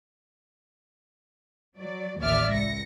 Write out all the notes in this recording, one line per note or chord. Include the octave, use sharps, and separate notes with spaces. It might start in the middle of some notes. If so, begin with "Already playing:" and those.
F#3 D5
A1 D#2 D5 E5 D6 F6
C#2 A#6 C#7